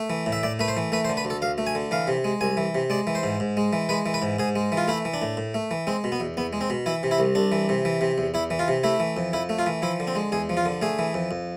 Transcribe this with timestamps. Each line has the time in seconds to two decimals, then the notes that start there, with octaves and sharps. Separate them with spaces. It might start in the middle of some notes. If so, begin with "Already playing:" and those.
Already playing: A3
0.10 E3
0.26 A2
0.32 E5
0.43 A2 D5
0.59 A3 B4
0.68 C5
0.77 E3
0.92 A3 B4
1.05 C5
1.09 D3
1.17 B4
1.25 D2
1.30 A4
1.42 D2 F5
1.58 A3
1.67 G#5
1.75 D3
1.91 E3 F5
2.07 C3
2.24 G#3
2.41 C2 G#5
2.57 E3
2.75 C3
2.90 G#3 D5
3.07 E3
3.15 C5
3.23 G#2
3.40 G#2
3.57 G#3
3.73 E3
3.89 G#3 B4
4.06 E3
4.14 B4
4.22 G#2
4.39 G#2 G#4
4.56 G#3
4.72 E3
4.77 F4
4.88 A3 E4
5.05 E3
5.14 D4
5.22 A2
5.37 A2
5.54 A3
5.71 E3
5.87 G#3 C4
6.04 B2
6.12 B3
6.20 E2
6.37 E2 B3
6.53 G#3
6.61 C4
6.70 B2
6.86 E3 E4
7.03 C3
7.11 E4
7.19 C2
7.35 C2 D4
7.52 E3
7.69 C3
7.85 E3
8.01 C3
8.18 E2
8.34 E2 E4
8.50 E3
8.59 F4
8.68 C3
8.83 A3 E4
9.00 E3
9.17 F2
9.33 F2 E4
9.49 A3
9.59 F4
9.66 E3
9.82 F3 E4
10.00 D3
10.07 C4
10.15 G#3
10.32 E2 G#4
10.49 F3
10.57 F4
10.65 D3
10.82 A3 G#4
10.99 E3
11.14 F2
11.31 F2